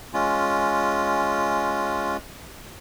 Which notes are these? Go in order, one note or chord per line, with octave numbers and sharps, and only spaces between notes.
G#3 C#4 F4